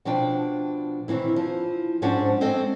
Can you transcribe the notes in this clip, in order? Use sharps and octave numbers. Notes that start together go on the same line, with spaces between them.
B2 F3 D4 G5
D#3 E3 C4 E4
F3
G#2 F3 C#4 D4 C5 F#5
G#3 C4 A4 D#5